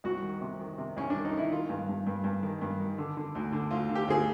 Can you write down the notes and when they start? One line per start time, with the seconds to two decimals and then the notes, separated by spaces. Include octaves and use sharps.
0.04 C2 F#4
0.22 D#3
0.41 C3
0.59 D#3
0.78 C3
0.97 C2 C#4
1.10 D4
1.15 D#3
1.25 D#4
1.33 D#3 E4
1.51 D#3 F4
1.69 G2
1.88 G2
2.07 G2
2.24 G2
2.43 D#3
2.61 G2
2.79 D#3
2.98 D3
3.17 D3
3.35 D2
3.53 D3
3.71 D2 F4
3.89 D3
3.95 G4
4.08 D2 G#4